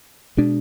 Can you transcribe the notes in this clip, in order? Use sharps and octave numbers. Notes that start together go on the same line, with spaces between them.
B2 G#3 D4